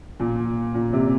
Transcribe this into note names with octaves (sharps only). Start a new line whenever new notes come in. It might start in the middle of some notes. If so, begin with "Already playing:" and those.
A#2
A#2
C3